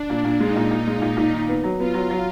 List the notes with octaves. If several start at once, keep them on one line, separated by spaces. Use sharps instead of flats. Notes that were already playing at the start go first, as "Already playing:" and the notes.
Already playing: D4
A#2
A#2
G#3 D#4
A#2
A#2
G#3
A#2
A#2
D#3
B3
F#3
B3 F4
F#3
F#3